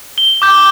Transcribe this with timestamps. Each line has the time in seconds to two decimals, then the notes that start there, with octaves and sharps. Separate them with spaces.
0.18 G7
0.42 D6 G6